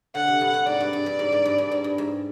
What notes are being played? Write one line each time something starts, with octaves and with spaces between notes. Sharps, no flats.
D3 F#5
C3
G2
G2
G#2 D5
G2
G2
G2
G#2
G#2
G2
G2
G#2
G2
G#2